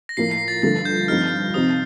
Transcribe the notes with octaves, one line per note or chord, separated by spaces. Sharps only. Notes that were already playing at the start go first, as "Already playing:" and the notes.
A#6
A2 F3 A#3 C7
C7
A6
G2 D3 F3 A3 A6
G6
G2 F3 C4 D#4 F6
C3 F3 C4 D#4 D#6